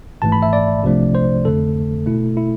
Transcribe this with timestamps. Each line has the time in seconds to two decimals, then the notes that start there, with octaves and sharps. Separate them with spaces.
0.22 G#1 G#2 E3 A3 A5
0.32 B5
0.42 E5
0.53 D5
0.83 C2 C3 F3 A3 D4
1.15 C5
1.45 F2 D3 A3 A4
2.06 B2 A3 E4
2.37 E4